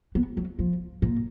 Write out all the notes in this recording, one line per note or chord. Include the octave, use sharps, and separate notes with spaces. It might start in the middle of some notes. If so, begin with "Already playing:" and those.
B3
F#3
F3
A#2